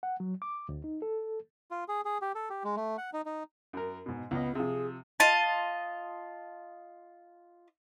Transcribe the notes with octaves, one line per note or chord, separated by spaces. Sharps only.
F#5
F#3
D6
D2
D#4
A4
F4
G#4
G#4
G4
A4
G4
G#3
A3
F#5
D#4
D#4
F#2 A#4
G#2 B2
C#2 B3 D#5
C3 F3 G#4
F4 D#5 A5